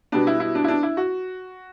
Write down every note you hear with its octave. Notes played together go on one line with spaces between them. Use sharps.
B2 G3 B3 D4
E4
E4
D4
E4
D4
E4
F#4